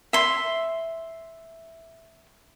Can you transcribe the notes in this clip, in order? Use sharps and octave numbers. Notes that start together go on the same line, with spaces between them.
E5 C6